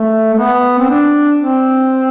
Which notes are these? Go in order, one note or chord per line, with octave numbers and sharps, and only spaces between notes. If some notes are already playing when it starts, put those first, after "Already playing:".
Already playing: A3
A3
B3
C4
D4
C4